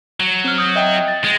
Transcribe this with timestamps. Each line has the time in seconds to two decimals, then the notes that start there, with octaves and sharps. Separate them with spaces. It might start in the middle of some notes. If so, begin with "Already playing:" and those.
0.20 F#3
0.44 C4 F6
0.58 D#6 G6
0.76 D#5 E5 G5
1.08 A6
1.24 G#3